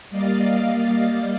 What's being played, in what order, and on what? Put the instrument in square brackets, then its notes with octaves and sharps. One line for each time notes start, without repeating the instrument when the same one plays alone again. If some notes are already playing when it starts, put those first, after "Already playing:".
[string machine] G3 A#3 D5 D#5 F5 A6